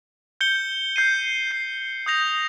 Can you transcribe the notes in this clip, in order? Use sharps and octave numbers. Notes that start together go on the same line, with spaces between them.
G6 C#7 G7
G6 C7 D#7
G6 C7 D#7
D#6 G6 A#6 F7